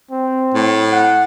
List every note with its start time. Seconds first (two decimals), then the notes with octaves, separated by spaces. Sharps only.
0.11 C4
0.54 A2
0.92 F#5